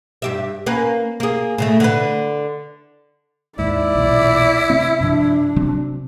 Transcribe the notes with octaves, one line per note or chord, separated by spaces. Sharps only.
G2 G4 E5
A#3 C#4 B4
A#3 G#4
A2 C#3 A3
D3 B4
D#2 G#2 E4 D5
B1 E2 A#2
C3 A3 C4
G2 C3 F3 D4
C3 F#3 C4